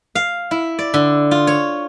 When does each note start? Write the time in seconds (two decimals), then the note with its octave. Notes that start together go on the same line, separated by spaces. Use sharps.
0.15 F5
0.51 E4
0.79 D5
0.94 D3
1.31 F4
1.47 C#5